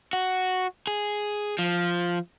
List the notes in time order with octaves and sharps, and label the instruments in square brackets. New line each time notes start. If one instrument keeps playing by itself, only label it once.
[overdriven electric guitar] F#4
G#4
F3